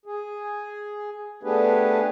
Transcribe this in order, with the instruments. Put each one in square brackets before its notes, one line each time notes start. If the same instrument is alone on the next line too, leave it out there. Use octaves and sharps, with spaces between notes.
[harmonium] G#4
A3 B3 D4 G4 G#4 B4